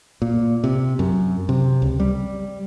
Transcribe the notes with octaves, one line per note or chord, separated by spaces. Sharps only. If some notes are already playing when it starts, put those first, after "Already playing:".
A#2
C3
F#2
C3
C#2
G3